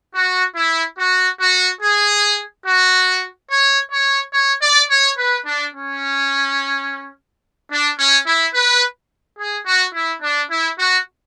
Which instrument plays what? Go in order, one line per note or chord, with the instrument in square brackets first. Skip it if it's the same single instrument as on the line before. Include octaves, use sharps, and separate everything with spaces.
[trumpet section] F#4
E4
F#4
F#4
G#4
F#4
C#5
C#5
C#5
D5
C#5
B4
D4
C#4
D4
C#4
E4
B4
G#4
F#4
E4
D4
E4
F#4